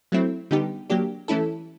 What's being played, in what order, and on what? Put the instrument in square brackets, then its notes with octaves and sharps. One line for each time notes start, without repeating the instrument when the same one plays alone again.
[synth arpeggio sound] F#3 A3 C4 E4
D3 G3 B3 D#4 G4
F#3 A#3 D4 G4
E3 A3 C#4 E4 A4